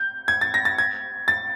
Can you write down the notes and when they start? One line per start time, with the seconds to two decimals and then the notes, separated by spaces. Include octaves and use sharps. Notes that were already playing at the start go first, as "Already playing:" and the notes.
Already playing: G6
0.28 G#6
0.41 A6
0.54 A#6
0.65 A6
0.78 G#6
1.28 A6